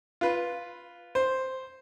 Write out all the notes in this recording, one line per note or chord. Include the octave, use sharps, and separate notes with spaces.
F4 B4
C5